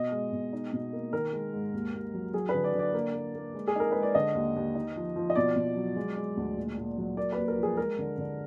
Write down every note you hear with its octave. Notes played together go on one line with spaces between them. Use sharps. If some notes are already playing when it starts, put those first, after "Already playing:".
Already playing: B2 D#5
G#3
B2
D#4
B2
A#3
D#3 A#4
G#3
G#2
D#2
D#2
F#3
F#3 G#4
B4
D3
D5
D3 D5
A#3
A#3
A#3
G#3
G#4
D#4 A#4
G#3 B4
D5
D3 D#5
D#2
D#2
D#4
F3
F3
D#5
B2 D5
B2
F#3
G#3
G#3
D2
A#2
A#2
F#3
A#3 D5
D#2 B4
A#4
F3
G#4
G#3 A#4
D3
D3